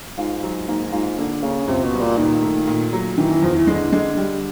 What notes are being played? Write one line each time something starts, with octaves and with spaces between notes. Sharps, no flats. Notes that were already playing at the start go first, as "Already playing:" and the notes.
G#2 F4
F#3
G#2 A#3
G#2 F4
D3 A#3
C#3 A#3
C#2 C3
B2
G3
A#2
A#2 D#3
A3
A#2
F#3
D#3 E3
E3
E2 F3
E3
D3 G#3
D3 G#3
G3